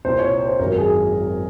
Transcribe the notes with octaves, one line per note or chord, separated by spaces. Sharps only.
C2 A#2 C5
C#5
C#5
C5
G#1 F#2 D#3 A#4
G#4